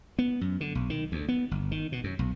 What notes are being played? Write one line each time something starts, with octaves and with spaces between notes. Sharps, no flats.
B3
F#2
D3
B1
D#3
D2
B3
G1
D#3
B2
F#2
B1